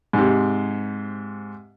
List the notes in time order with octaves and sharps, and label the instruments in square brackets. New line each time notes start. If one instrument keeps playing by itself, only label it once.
[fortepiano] G#2 C3